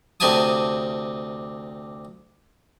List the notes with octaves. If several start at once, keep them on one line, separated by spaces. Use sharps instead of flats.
D2 C3 G4 G#5 A5 D#6